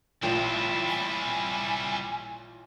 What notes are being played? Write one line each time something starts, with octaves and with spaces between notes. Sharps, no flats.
A1 A#2 G3 E4 G5
G#5